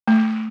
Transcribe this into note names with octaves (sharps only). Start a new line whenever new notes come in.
A3